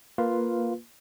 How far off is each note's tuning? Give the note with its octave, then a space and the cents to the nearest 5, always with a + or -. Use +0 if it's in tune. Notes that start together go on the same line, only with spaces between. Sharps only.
A#3 +0 F4 +0 B4 +0